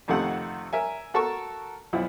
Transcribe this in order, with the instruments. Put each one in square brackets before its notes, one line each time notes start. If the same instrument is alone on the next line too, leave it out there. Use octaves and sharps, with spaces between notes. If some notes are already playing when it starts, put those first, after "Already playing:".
[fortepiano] F2 C3 D#3 A3 F#5
A#4 E5 G#5
F#4 A4 A#4 A5 C#6
B1 F3 E4 F#5